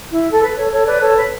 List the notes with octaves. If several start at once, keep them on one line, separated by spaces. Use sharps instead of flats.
E4
A4
B4
A4 C#5
A4 C#5
B4 D5
A4 C#5
B4